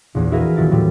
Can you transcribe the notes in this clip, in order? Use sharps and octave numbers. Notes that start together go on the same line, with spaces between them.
A#1 E2
E4 F#4 G#4 A#4 B4 F5
D#1 F#3 E4 A6
A2 F3 G3